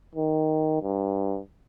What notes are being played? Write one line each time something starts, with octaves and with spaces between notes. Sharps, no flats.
D#3
G2